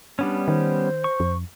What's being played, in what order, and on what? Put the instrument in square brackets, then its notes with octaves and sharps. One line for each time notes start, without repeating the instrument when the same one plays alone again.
[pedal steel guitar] G3 B3 C#4 [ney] D4
[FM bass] D#3 [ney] C5
[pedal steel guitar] C#6
[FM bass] F2